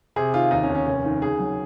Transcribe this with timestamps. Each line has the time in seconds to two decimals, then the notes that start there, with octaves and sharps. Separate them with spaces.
0.16 C3 G#4
0.34 D#3 F4
0.51 D#2 D#4
0.63 C#4
0.69 D#2
0.75 C#4
0.87 F1 C#4
1.05 D#3
1.22 C#3 G#4
1.39 F#3